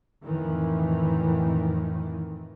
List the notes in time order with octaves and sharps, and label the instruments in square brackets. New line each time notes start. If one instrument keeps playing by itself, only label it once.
[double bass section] F2 A2 D#3 E3